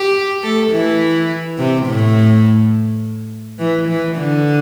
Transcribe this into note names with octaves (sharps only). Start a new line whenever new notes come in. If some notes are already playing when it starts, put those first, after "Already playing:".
Already playing: G4
A3 A4
E3 E4
C3 C4
A2 A3
E3
E3
D3